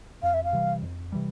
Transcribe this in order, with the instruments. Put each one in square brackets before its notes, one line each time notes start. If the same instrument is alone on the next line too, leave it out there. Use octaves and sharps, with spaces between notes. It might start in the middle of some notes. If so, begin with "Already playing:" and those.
[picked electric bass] F2 [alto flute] F5
[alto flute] E5
F5
[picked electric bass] C3 E3 G3
F2
C3 E3 G3